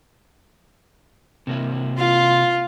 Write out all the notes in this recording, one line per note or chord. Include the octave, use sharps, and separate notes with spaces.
C3 A#3 E4
F4 F5